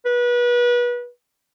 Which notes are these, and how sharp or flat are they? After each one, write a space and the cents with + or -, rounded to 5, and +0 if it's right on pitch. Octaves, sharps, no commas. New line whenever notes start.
B4 -30